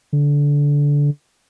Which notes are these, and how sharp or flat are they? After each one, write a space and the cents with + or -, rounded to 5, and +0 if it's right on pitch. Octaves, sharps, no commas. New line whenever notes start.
D3 -20